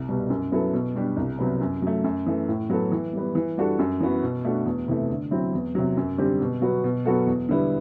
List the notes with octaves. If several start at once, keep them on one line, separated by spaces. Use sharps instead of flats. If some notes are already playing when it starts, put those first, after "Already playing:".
Already playing: C2
B2 G3
F#2
F#3 B3 E4 A4
B2
G3 D4 G4
C2
C3 F#3 B3
F#2
F#3 A3
F#2
E3 A3
A2
F#3 B3 F#4 A4
E3
G3 B3
E3
G3 D4 F#4 A4
F#2
E3 B3 F#4
B2
A3 D4 F#4 A4
E2
C3 E3 A3
D3
F#3 C4 E4
E2
C3 F#3
F#2
D3 G3 C4 G4
B2
F#3 B3 F#4
B2
F#3 B3 F#4 A4
E2
D3 G3 B3 E4